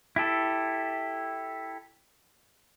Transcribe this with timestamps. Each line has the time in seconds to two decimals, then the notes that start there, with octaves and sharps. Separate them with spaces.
0.16 E4 G4 A4